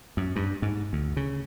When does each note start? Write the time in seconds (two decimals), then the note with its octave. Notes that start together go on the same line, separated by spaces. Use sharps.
0.17 F#2
0.36 G2
0.62 G#2
0.93 D2
1.17 C#3